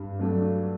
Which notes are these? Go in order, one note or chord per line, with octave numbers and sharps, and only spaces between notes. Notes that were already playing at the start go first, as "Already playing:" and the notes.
Already playing: G2
F#3 A3 D4